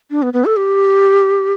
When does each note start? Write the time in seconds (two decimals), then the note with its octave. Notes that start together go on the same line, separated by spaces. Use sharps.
0.11 D4
0.22 B3
0.33 B3
0.45 A4
0.57 G4